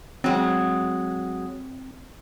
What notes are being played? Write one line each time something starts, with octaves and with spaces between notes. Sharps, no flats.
F#3 G#3 C4